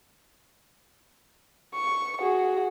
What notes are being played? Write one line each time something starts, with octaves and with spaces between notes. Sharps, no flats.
C#6
F#4 G#4